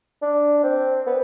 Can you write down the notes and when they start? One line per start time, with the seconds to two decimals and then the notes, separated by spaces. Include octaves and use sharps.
0.22 D4
0.64 C4
1.07 B3